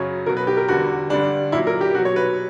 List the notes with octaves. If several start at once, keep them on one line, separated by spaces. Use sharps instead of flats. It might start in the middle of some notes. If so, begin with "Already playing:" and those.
Already playing: F#2 C#3 F#3 C#5
B2 F#3 A#4
B4
G4
A#4
E2 D3 G3 F#4
G2 D3 G3 D4
A#2 F#3 E4
A#4
G4
B2 F#3 F#4
C#5
B4